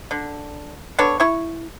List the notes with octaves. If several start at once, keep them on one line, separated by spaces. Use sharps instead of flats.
D3
B3 D4 A4 C#5
E4 C#6